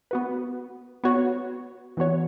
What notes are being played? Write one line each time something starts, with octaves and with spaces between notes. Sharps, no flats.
B3 F#4 B4
B3 F#4 C#5
E3 B3 F#4 C#5